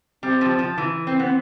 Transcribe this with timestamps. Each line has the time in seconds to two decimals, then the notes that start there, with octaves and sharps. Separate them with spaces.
0.23 G3 C4
0.41 F3
0.59 F3
0.78 E3
1.07 C4
1.20 B3
1.25 C4